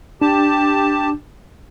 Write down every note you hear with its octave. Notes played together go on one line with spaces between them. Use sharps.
D4 G4 A5